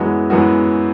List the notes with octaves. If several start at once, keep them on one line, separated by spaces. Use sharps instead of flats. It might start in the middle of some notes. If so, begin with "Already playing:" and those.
Already playing: F#2 E3 G#3 B3 F#4
F#2 E3 G#3 B3 F#4